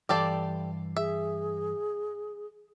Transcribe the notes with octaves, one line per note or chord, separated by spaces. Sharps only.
G2 E3 G4 A4 D5 F5
G#4 E5